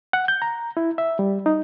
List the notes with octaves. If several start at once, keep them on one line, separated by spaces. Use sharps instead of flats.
F#5
G6
A#5
E4
E5
G3
D#4